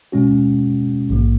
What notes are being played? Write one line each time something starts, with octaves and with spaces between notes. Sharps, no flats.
B2 G#3 C#4 F#4
A#1 G#2 F3 A#3